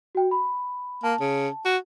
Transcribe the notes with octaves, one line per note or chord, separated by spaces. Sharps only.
F#4 G5
B5
A#3 A5
C#3
F#4